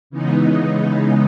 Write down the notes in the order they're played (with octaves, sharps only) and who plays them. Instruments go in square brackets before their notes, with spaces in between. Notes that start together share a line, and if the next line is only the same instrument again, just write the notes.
[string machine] C#3 E3 G#3 B3 D#4